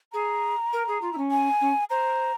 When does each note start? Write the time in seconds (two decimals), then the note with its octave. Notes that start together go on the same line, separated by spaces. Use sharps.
0.13 G#4 A#5
0.73 A#4
0.88 G#4
1.01 F4
1.12 E4
1.17 C#4
1.31 G#5
1.61 C#4
1.90 C5 A#5